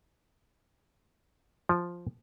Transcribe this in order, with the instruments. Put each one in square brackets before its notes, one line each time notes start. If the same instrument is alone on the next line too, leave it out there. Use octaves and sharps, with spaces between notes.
[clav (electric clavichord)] F3